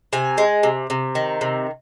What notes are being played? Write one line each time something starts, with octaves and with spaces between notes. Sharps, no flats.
C3 G#5
G#3
C3
C3
D#3
C3